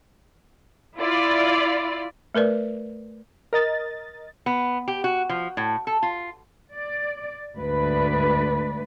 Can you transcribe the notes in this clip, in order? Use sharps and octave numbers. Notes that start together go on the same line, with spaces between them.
E4 F4 D5
A3 A#4 B4 D5
A#4 D#5 A6
B3
G4
F#4
F3
A2
A4
F4
D5
D2 G#2 B4 D5